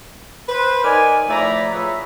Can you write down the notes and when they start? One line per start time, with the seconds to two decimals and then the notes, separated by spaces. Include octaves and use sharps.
0.49 B4 C5
0.84 D#4 A#4 D5 G#5
1.29 A2 F3 A3 D5 A#5 B5
1.73 F4 G#4 B4 C#5 E5